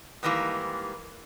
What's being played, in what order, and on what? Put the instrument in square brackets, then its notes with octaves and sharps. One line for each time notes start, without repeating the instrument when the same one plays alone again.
[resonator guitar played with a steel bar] G#2 D#3 E3 G3 A#3